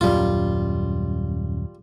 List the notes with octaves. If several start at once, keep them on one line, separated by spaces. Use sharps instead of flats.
D#1 F#2 G3 F4